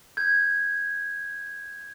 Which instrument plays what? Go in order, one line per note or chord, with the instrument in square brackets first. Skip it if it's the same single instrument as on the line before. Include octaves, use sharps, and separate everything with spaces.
[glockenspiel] G6 G#6